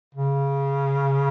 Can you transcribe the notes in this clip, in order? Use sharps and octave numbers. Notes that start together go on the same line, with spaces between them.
C#3